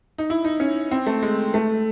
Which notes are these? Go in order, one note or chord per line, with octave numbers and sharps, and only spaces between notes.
D#4
E4
D#4
C#4
C4
A3
G#3
A3